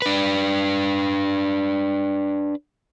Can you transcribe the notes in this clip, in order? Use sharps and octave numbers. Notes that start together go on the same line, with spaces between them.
D4 B4